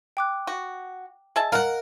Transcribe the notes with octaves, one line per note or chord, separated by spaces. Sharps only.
G5 D6 F#6
F#4
G#4 D#5 E5 A5
A#4 F5 F#5